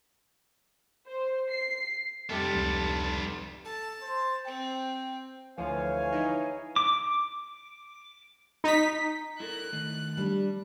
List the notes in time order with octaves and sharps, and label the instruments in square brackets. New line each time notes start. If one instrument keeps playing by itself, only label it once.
[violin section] C5
C7
[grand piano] F1 G4 [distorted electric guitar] G3 B3 [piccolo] A5
[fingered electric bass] C#2 F3
[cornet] A4 [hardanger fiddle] A5
[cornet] C5
[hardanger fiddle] C4 [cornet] G5
[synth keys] D2 F3 [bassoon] E3 [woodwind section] C#5 F5 G#5
[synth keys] D#4 E4 G#4
[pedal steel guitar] D6
[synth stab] D#4 B6
[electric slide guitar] E4 A4 A#4 [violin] F#6
[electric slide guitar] D#3 A3
[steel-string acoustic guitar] G3 D4